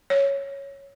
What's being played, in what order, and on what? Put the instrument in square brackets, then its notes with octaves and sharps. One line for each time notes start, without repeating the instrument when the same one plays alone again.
[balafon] C#5